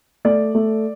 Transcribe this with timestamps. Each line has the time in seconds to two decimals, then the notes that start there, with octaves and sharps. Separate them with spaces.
0.25 A3 D5
0.55 A3